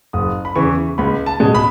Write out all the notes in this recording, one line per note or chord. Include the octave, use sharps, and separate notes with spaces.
F#1 D#6
B5
E2 C#3 E3 C#6
C#2 B5
A5
B2 G#3
B5